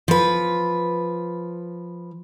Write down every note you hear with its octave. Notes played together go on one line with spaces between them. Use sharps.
F3 B4